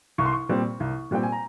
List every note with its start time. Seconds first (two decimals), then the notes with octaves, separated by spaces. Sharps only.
0.18 C2 C#6
0.25 C6
0.33 C#6
0.49 A#2 G3 C4
0.80 C2
1.11 A#2 G3 C4 G5
1.23 G#5
1.32 A#5